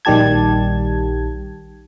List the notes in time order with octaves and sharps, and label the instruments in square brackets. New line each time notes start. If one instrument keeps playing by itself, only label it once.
[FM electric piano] A#1 D#3 G3 G4 A5 G#6